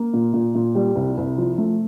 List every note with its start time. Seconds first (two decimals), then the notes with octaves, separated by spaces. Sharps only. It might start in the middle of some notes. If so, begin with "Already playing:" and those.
Already playing: A#3
0.13 A#2
0.33 A#2
0.55 A#2
0.75 G3
0.95 C2
1.17 C2
1.38 F3
1.58 A3